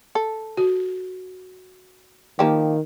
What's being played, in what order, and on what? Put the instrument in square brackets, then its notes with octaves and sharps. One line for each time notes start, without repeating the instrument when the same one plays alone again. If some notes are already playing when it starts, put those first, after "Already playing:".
[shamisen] A4
[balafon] F#4
[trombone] D#3 [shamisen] F3 A#3 G4